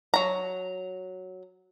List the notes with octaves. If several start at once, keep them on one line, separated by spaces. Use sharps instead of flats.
F#3 A#5